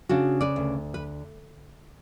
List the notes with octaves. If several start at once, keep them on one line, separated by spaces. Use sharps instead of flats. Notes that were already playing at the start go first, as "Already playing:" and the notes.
C#3 D4 F#4
B4 D5
D2
B4